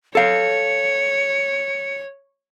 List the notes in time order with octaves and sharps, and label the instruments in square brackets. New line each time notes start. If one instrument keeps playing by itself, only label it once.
[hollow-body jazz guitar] A4 F5 [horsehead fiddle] C#5 [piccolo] C#7